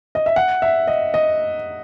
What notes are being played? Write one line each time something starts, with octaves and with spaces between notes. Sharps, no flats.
D#5
E5
F#5
E5
D#5
D#5